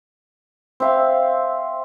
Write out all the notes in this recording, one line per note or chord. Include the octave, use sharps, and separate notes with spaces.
C4 E5 F5